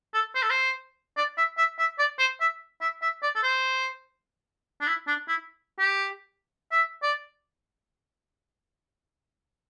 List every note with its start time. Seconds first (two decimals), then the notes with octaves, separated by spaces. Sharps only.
0.14 A4
0.35 C5
0.43 A4
0.51 C5
1.17 D5
1.38 E5
1.58 E5
1.79 E5
1.99 D5
2.19 C5
2.41 E5
2.81 E5
3.02 E5
3.23 D5
3.35 A4
3.44 C5
4.81 D4
4.87 E4
5.07 D4
5.29 E4
5.80 G4
6.72 E5
7.03 D5